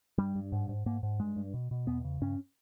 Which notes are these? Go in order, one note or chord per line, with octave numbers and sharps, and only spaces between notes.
G2 G3
G2
G#2
G#2
G#2 A#3
G#2
G2 G#3
G2
B2
B2
E2 B3
C#3
G2 C#4